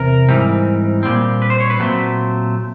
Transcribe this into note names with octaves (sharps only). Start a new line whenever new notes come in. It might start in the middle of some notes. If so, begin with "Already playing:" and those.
Already playing: E2 C3 A#4
G#2 E3 G3 C4
A#2 G3 C4
B4
C5
C#5
B4
A#2 F#3 A3 C4